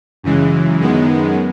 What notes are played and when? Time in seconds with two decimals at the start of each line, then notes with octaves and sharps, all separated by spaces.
0.23 F#2 C#3 E3 G#3
0.80 F#2 D#3 G#3 B3